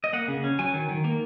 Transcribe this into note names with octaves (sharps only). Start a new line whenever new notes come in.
D#5
A#3 F#5
C#3
C#4
F#3 G#5
D#3
D#3
A#3